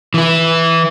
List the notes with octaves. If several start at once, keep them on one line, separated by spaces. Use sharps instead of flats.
E3 E4